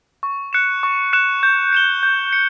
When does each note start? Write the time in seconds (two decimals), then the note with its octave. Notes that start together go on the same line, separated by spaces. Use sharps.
0.23 C#6
0.53 F#6 C#7 E7
0.83 C#6
1.13 F#6 C#7 E7
1.43 G6
1.72 C#7 E7 G7
2.03 G6
2.33 C#7